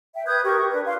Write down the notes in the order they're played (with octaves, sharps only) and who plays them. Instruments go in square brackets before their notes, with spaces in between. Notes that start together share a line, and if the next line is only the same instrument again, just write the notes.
[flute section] E5 G5
B4 D#6 G6 G#6
G4 A#4 C#6
C#6
D4 B4
F4 F5 C6